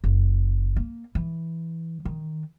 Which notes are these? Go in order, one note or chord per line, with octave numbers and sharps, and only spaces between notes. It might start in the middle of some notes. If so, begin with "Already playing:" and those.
F#1
A#3
E3
D#3